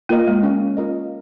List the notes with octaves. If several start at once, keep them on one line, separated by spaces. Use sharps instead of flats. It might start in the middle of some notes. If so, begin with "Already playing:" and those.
A#3 F4 A#4 D#5
G#3
C#4
F4 A#4 D#5